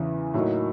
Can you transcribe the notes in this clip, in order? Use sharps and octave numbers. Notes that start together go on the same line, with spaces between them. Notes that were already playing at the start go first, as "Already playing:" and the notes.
Already playing: E2 C#3 E3
A2 F#3 A#3 D#4